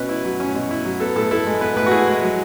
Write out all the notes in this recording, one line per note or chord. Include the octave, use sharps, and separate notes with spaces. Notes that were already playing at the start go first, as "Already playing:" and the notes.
Already playing: B2 C#4 B4
E4
F#3
C#4
B2
E4
F#3
B3 A4
A2 A4
E4 A4
G#3
B3 B4
A2 B4
F#4
E4 G#4
G#3
F#3